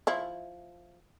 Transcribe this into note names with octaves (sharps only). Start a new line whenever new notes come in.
F3 E4